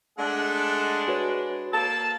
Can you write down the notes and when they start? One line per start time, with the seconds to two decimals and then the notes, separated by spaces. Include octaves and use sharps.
0.18 G#3 A3 D4 A4 F#5
1.08 F#4 B4 C#5
1.73 A#3 A5 E6